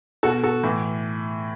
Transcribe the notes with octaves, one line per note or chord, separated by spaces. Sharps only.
B2 F#4 A4
F#4 A4
A2 E3